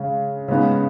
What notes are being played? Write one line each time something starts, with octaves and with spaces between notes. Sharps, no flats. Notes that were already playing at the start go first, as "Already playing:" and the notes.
Already playing: C#3 G#3
C#3 G#3 B3 D#4